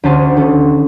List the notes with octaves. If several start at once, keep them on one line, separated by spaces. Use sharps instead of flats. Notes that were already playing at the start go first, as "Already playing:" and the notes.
D2 C#4 G4 C5 A5 D#6
D#3 C#4 A4